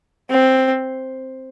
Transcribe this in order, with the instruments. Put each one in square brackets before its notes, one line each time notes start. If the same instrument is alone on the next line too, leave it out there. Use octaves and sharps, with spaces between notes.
[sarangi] C4